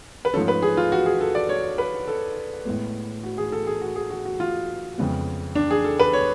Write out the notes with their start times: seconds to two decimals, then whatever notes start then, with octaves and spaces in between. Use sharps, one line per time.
0.25 B4
0.33 G#2 F3 A3 C#4 A4
0.48 B4
0.62 G#4
0.77 F4
0.92 F#4
1.06 G#4
1.21 A4
1.35 D5
1.49 C#5
1.78 B4
2.08 A4
2.65 A2 G#3 B3
3.23 F#4
3.38 G#4
3.52 A4
3.67 G#4
3.81 F#4
3.96 G#4
4.10 F#4
4.25 F#4
4.40 F4
4.98 F2 C#3 G#3 B3
5.55 D4
5.71 G#4
5.84 A4
5.99 B4
6.13 C#5